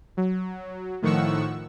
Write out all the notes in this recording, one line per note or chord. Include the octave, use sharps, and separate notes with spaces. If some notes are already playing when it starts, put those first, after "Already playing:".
F#3
A2 D#3 F3 F#5 C#6 E6